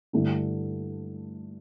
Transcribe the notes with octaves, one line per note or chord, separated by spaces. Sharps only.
G2 D3 A3 E4